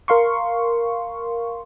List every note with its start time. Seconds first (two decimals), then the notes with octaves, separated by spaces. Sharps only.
0.08 A#4 F5 C6 C#6